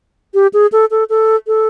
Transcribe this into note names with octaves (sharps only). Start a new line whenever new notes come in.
G4
G#4
A4
A4
A4
A4